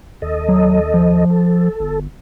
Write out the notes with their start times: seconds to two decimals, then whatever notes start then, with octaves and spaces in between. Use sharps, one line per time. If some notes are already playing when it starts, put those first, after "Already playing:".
0.22 D#2 A4 D#5
0.49 F#3
0.94 F3
1.30 A4
1.80 G1